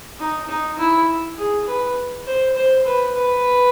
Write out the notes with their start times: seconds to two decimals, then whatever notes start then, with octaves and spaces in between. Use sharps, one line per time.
0.20 D#4
0.49 D#4
0.78 E4
1.38 G#4
1.67 B4
2.27 C5
2.56 C5
2.85 B4
3.15 B4